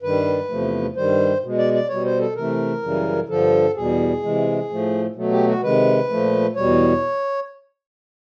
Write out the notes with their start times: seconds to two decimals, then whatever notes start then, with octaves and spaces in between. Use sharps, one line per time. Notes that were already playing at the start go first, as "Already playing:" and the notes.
0.02 G2 D#3 G3 B4
0.49 E2 C3 F3 A3
0.96 G2 D#3 G3 C5
1.42 B2 G#3
1.58 D5
1.74 D5
1.89 B2 G3 C#5
2.05 C5
2.20 A4
2.36 C3 E3 A3 A#4
2.83 F#2 C#3 E3 G3
3.29 G2 D3 F3 A4
3.75 E2 B2 G3 G#4
4.23 C3 E3 G#3
4.69 A2 F3 A3
5.15 B2 F#3 A3
5.32 G4
5.47 F#4
5.62 C3 D#3 G#3 B4
6.09 A#2 F3 A3
6.56 E2 B2 G3 C#5